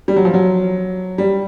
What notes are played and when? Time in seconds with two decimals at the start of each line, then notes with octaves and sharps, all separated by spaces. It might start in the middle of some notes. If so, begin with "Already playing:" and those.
0.08 G3
0.16 F#3
0.25 F3
0.34 F#3
1.18 G3